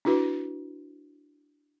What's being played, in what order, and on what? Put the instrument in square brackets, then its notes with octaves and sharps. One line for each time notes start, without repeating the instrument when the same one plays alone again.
[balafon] D4 E4 F#4 B4